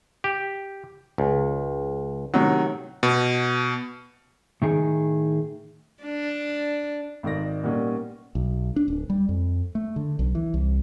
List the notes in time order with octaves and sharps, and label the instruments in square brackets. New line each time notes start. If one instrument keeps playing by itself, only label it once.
[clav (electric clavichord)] G4
C#2
[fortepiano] A2 C3 D#3 [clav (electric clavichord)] F#3
[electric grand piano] B2
[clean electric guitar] A2 D#3 G#4
[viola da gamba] D4
[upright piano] G#1 D#3 D5 A#6
A#2 G3 A#3 B3 C#4 D#4
[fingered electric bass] B1
D4
D1
G3
F2
A3
D3
B1
E3
C2